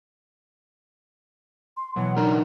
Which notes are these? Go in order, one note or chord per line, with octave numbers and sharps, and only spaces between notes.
C6
B2 E3 F#3 F#5
D4 D#4 A#4 A#5